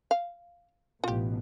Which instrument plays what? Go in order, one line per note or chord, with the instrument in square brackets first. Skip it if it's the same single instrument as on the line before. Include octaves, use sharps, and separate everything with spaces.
[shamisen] F5
[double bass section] A1 B2 [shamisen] F4 G4